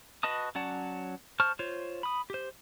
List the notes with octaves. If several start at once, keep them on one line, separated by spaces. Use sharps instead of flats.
F#4 B4 D#5 A5 D#6
F#3 C#4 D5 F#5 A5
C5 A5 C#6 F6
F4 C5 C#5
B5 D#6
G4 C5